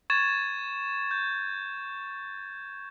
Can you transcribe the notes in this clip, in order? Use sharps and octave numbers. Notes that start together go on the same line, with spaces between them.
C#6 G#6 A6 E7
G6